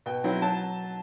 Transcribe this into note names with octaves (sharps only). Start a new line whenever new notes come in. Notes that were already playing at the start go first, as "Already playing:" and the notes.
B2 G5
F#3 C4 E4
F#3 A5